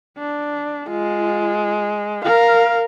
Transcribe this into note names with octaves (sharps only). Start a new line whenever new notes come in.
D4
G#3 F4
A#4 F5